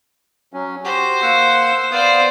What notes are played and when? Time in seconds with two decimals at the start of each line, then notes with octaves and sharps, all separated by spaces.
0.53 F#3 C#4
0.85 F#4 G4 C5
1.22 A#3 F#5 E6
1.92 B3 C5 D5 F5 D#6